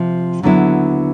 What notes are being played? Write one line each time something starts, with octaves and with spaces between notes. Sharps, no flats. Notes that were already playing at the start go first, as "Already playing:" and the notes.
Already playing: C3 F3
D#2 D3 F#3 B3 E4